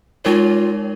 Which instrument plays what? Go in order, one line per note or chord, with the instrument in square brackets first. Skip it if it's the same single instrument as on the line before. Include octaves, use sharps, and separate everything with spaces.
[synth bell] G#3 D#4 A#4 C#5 [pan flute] F4